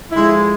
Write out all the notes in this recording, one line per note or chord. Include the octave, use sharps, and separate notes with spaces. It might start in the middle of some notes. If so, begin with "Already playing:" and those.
D3 F3 G#3 E4